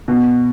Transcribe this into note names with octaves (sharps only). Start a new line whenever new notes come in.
B2